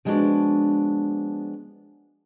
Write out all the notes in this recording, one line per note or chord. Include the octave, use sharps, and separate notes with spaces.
F3 G#3 A#3 B3 D4 F#4